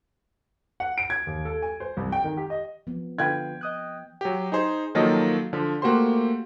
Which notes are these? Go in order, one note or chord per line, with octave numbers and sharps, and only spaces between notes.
F#5
D7
G#6
D#2
A4
G#5
C5
C2
G5
D#3
G4
D#5
F3 B3
D3 F4 B4 G5 G#6
D#5 D#6 F#6
F#3 G4
D#4 G#4 C5
D#3 F3 F#3 A#3 A4 D#5
D3 F3
A3 A#3 F#4 G4 C5 C6